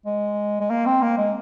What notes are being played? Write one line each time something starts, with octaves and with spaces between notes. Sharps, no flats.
G#3
G#3
A#3
C4
A#3
G#3